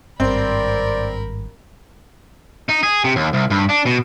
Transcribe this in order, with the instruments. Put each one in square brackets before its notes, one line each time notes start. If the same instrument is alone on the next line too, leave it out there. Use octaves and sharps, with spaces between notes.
[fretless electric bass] G#1 G2 [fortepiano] C4 [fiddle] A#4 B5 [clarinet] D5
[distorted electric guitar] D#4
G#4
C3
D#2
C2
G2
D4
B2